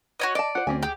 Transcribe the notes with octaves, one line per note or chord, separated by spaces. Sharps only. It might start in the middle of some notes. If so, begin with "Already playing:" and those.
F#4 C#5 D#5
D5 D#5 A5
F4 C5 F#5
D2 C4 C#4 G#5
G4 G#4